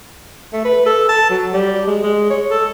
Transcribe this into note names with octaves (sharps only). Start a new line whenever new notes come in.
A3
B4
A4
A5
F#3
G3
G#3
G#3
C#5
A4